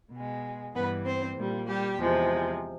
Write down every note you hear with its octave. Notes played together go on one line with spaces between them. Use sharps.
B2 G#3
G2 E3 G3 B3 B4
C4 C5
A#2 G3
G3 G4
E2 C3 F3 G#3